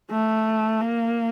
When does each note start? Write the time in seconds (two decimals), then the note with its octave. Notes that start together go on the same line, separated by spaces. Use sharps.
0.11 A3
0.81 A#3